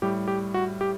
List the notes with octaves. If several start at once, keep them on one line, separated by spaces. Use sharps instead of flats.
A2 G3 G4
G4
F#4
G4